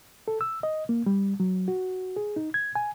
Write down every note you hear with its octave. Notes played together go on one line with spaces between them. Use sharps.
A4
E6
D#5
A#3
G3
F#3
F#4
G#4
D#4
G#6
G#5